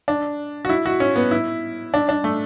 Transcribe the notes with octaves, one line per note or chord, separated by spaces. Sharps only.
D4
F#4
E4
F#4
C#4
B3
E4
D4
D4
A3